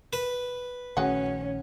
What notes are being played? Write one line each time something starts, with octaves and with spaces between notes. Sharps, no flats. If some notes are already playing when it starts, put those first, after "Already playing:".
B4
A#1 D#3 A3 C#4 F#4 G#4 F#5